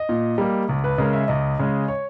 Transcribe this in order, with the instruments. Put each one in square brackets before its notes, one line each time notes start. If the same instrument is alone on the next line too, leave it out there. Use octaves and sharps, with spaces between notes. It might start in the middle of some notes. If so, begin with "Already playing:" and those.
Already playing: [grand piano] D#5
A#2
G3 A#3
C#2
B4
C#3 G#3 A#4
E5
C#2 D#5
C#3 G#3
C#5